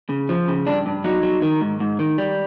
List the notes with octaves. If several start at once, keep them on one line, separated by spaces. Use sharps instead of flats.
C#3
F3
C#3
G2 D4
G2
F#3 D#4
F#3
D#3
G#2
G#2
D#3
G3